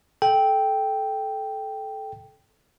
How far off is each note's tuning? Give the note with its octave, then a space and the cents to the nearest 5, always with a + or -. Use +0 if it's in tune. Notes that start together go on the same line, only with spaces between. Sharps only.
A4 -20 G5 +0